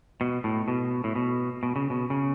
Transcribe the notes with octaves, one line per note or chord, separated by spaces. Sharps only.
B2
A2
B2
A2
B2
B2
C#3
B2
C#3